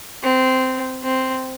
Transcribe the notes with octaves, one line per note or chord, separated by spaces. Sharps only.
C4
C4